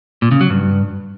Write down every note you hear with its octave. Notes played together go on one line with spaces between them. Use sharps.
A#2
C#3
F#3
G2